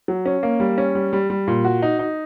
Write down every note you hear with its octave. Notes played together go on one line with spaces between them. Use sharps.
F#3
C#4
A#3
G3
C#4
G3
G3
G3
A#2
F#4
D#4
D#4